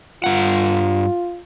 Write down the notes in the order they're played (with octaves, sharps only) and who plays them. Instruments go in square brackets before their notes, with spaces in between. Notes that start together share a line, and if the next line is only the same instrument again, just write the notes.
[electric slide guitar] G2 F#5 [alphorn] F4